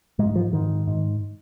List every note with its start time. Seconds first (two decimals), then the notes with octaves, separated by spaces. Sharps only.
0.19 G#2 G#3
0.36 F3
0.53 G#2 D#3
0.87 G#2